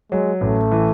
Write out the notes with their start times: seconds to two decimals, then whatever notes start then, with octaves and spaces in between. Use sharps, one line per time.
0.11 F#3 G#3
0.41 A1 A3
0.72 E3